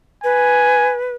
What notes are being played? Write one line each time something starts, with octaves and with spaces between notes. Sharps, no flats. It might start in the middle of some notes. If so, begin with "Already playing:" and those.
B4 G#5